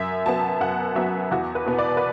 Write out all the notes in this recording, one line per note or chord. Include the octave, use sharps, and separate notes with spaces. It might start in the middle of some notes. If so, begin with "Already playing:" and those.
Already playing: F#2 E5
F#3 B3 A5
F#2 F#5
F#3 B3 E5
E2 F#4
B4
B2 B3
D5
B4